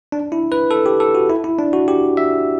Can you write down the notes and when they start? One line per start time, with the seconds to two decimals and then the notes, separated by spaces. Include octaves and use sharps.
0.12 D4
0.32 E4
0.52 B4
0.71 A4
0.86 G4
1.00 A4
1.15 F#4
1.29 E4
1.44 E4
1.59 D4
1.73 F#4
1.88 G4
2.17 E5